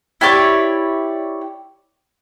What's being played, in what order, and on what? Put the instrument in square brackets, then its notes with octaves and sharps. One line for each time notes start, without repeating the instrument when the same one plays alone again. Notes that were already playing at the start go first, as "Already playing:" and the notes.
[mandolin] E4 G4 C#5 D5